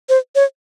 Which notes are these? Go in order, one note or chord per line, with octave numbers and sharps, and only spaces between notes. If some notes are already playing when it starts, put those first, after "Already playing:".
C5
C#5